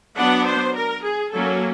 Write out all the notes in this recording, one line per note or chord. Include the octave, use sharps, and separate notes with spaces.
F#3 B3 D4 F#5
C5
A#4
G#4
F#3 A#3 C#4 A4